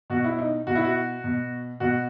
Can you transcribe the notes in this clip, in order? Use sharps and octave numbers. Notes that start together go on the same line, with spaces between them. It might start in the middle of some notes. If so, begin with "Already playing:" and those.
B2 F#4
E4
D#4
B2 F#4
E4
F#4
B2
B2 F#4